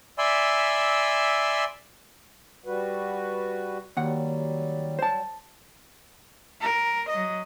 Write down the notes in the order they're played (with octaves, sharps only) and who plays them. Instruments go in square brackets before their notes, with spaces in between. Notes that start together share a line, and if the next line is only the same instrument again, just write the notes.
[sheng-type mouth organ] D5 E5 G#5 B5 C6 E6
[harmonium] G3 F#4 B4
[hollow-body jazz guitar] D#2 F#5 [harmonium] F#3 G3
[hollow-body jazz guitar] C5 A5
[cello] A#4
F#3 D#5